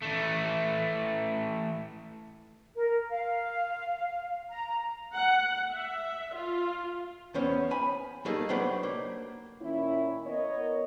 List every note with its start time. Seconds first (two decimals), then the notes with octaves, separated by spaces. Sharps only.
0.02 E3 A3
2.75 A#4
3.10 F5
4.50 A#5
5.15 F#5
5.73 E5
6.34 F4
7.34 E2 B3 C#4 C5 C#5
7.71 G#5 B5
8.25 G3 A3 A#3 D#4 G#4 A4
8.49 F#3 A3 D4 B4 C5 F#5
8.83 A#3
9.61 A#2 D#3 C#4 E4
10.24 B3 A#4 C#5 D#5